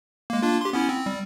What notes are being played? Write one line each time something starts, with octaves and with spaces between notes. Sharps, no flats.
G#3 A#3
A#3 D4 F4
G4 C6
B3 C#4 E4
C4
G3